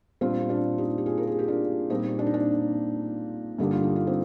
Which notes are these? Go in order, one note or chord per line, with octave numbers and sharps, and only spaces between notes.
A#2 G3 C4 D4 F4
D4 F4
D#4 G4
G4
F4 G#4
A#4
G#4
G4
D4 F4
A#2 G3 A#3 C4 D#4
D4
D#4
D4
G2 D3 G3 A#3 D#4
F4
D#4
F4
C4 D#4